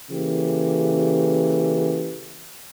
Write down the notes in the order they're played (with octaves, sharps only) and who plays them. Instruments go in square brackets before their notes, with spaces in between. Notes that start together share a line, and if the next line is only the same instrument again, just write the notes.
[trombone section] C#3 E3 A#3 G4 A4